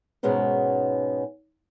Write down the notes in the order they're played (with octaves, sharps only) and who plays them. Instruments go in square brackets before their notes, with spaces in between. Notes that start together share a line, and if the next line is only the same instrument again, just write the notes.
[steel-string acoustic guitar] G#2 B2 G#3 B3 C#4 D#4